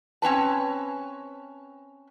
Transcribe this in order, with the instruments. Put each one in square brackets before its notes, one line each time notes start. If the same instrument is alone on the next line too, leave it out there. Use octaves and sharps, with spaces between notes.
[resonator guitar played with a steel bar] C4 C#4 B4 A5